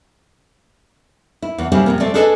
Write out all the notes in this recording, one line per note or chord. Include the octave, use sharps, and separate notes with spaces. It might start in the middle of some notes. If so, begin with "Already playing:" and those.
E4
E2 E3
C#3 G3 A#3 C4 D4 E4
F2 C3 A#3
A3 C4 D5
D4 G#4 A4 B4 D#5 A5